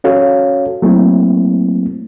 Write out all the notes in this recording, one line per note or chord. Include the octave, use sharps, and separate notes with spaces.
C#4 F#4 A4 C#5 F5
F#3 A3 A#3 C4 E4